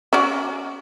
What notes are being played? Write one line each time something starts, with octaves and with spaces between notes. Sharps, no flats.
C#4 F#4 D5